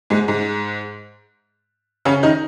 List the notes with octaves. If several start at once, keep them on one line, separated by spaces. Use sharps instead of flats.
G#2 G#3
G#2 G#3
C#3 C#4
D#3 D#4